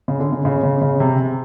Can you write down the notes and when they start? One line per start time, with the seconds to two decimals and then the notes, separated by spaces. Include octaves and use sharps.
0.08 C#3
0.20 D3
0.32 C#3
0.45 C#3
0.63 C#3
0.82 C#3
1.00 C3